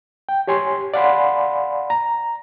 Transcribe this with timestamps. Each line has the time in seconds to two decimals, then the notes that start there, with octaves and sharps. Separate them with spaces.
0.29 G5
0.47 G4 C#5 G#5 C6
0.94 D5 F5 F#5 G#5 B5 C6
1.90 A#5